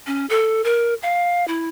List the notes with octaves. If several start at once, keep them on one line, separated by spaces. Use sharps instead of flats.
C#4
A4
A#4
F5
E4